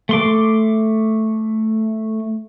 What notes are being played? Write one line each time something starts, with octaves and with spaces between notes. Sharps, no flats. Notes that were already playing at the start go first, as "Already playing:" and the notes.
A3 C6 D6